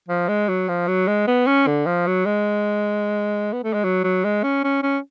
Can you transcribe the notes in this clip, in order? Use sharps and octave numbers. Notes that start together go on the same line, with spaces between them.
F3
G#3
F#3
F3
F#3
G#3
B3
C#4
D3
F3
F#3
G#3
B3
A3
G#3
F#3
F#3
G#3
C#4
C#4
C#4